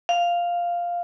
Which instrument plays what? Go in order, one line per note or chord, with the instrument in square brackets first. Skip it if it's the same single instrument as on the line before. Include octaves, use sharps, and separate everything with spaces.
[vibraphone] F5